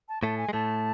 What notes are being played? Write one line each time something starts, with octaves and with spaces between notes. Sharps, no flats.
A5
A2 A3 A5
G#5
G#3
A2 A3 A5